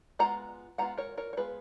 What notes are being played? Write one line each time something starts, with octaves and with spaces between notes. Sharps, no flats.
G#3 B3 F4 F#5 A#5
G#3 B3 F4 F#5 A#5
A#4 C#5
A#4 C#5
C#5
G#3 B3 F4 G#4 B4